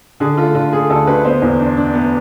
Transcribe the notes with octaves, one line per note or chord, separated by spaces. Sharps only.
D3 G#4
A3 F4
D3 F4
A3 G#4
D2 A4
D2 B4
B3 C5
E2
D4
D4
B3